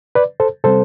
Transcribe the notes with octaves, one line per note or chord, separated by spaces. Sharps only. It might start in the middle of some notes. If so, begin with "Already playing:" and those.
B4 D5
A4 C5
C3 G3 C4 A4 C5